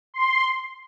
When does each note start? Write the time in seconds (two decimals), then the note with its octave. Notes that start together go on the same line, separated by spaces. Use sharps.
0.14 C6